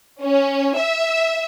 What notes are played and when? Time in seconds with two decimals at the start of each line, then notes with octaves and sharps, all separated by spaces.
0.22 C#4
0.76 E5